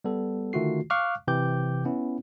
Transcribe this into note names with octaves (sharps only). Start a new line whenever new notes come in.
G3 B3 A4
D3 D#3 A3 F4 F#4 C7
F5 C#6 D6 F6 F#6
C3 E3 G5 D6 G6
B3 C#4 E4